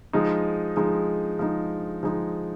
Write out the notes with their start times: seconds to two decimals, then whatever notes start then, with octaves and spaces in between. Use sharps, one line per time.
0.13 F3 G#3 D#4
0.76 F3 G#3 D#4
1.39 F3 G#3 D#4
2.03 F3 G#3 D#4